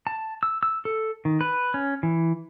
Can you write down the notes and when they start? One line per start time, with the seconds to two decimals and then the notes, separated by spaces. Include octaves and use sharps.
0.07 A5
0.43 E6
0.63 E6
0.85 A4
1.25 D#3
1.41 B4
1.74 C#4
2.03 E3